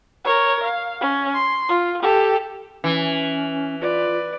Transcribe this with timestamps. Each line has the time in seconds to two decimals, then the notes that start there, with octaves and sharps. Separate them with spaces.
0.25 A#4 C#5
0.63 F5
1.01 C#4
1.34 C6
1.69 F4
2.02 G4 A4
2.84 E3 C#4
3.81 F4 B4 D5